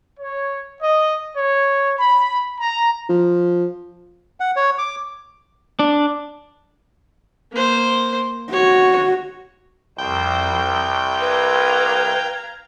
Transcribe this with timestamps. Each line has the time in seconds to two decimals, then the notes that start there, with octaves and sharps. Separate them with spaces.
0.19 C#5
0.83 D#5
1.36 C#5
1.99 B5
2.61 A#5
3.09 F3
4.40 F#5
4.56 C#5
4.78 D6
5.79 D4
7.52 A#3 C5
8.53 F#4 C#5
9.98 C2 F2 C5 G5
11.20 B4 F5 A#5 G#6